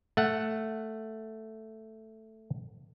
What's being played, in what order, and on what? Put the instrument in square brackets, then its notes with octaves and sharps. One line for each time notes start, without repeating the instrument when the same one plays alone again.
[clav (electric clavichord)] A3 F#5